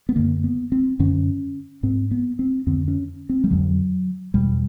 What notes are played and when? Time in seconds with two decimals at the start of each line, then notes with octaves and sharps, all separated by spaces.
0.09 B3
0.16 F#2 D3 A#3
0.44 B3
0.72 C4
0.99 F#2 D3 C#4
1.83 G#2 C4
2.11 B3
2.39 C4
2.67 F2 D3 C4
2.88 C#4
3.29 C4
3.44 G3
3.50 F2 D3 F#3
4.34 E2 B2 G3